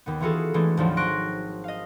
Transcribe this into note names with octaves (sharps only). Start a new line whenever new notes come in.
D#2 D#3 B3
E3 F4 F#4 G#4 A4
E3 G#3 A3 D4
G#1 D2 F3 F#3
C6 C#6 F#6 A#6 D7
D#5 F5